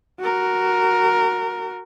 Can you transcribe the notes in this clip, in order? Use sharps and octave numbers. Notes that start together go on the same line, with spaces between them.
F#4 A#4